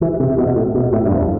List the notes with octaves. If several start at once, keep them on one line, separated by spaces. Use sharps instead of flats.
E3
C3
B2
A2
B2
A2
G2
F2